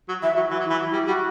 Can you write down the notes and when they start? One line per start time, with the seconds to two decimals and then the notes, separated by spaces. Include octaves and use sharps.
0.09 F#3
0.22 E3 E5
0.36 F#3 F#4
0.50 E3 F#4
0.60 F#3
0.64 E4
0.70 E3
0.79 F#3
0.93 G3
1.07 G3 F#4